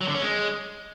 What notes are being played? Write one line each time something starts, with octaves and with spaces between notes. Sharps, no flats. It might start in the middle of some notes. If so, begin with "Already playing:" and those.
F#3
D3
C#4
G#3